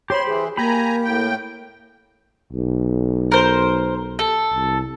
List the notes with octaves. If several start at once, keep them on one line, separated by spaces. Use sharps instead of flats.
G4 C5 C#5 B5 C6
E3 G#4
A#3 G4 G#5 A#5 B5
A2 G5
B1
A#4 C5
A4
C2